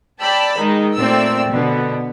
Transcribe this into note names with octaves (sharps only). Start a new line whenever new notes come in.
D5 G5 A5 B5 E6
D#3 G#3 D#4
A#2 A3 C4 D5 E6
B2 D3 B3